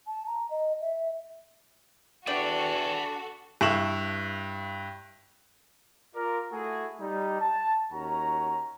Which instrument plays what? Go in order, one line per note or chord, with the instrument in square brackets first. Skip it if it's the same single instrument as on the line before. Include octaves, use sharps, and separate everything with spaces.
[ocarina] A5
A#5
D#5
E5
[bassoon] E2 [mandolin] D4 G5 [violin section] F#4 A4 [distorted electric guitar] G#5 B5
[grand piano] G2 E4 C#6 E7 F#7
[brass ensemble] F4 A#4 D5
A3 E4 F#4 G#4
G3 D#4
A5
D#2 C#4 F#4 A#5